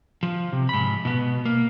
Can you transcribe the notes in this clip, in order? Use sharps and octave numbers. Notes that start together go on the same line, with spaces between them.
F3
C3
G#2 B5
B2 B3
A#3